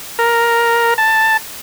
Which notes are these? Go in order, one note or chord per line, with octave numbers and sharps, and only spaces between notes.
A#4
A5